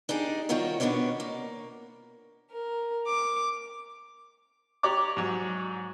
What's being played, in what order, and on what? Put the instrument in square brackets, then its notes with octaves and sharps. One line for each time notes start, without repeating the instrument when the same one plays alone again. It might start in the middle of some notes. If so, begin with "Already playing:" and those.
[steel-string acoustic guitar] D4 D#4 G4 G#4
D#3 G3 F4 F#4 A#4 C#5
B2 B3 C#4 D4 C#5
A#3
[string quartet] A#4
D6
[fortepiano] G4 C#5 D5 A#5 D6
G#2 F#3